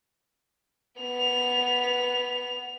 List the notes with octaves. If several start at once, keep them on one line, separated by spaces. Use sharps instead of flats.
B3 F7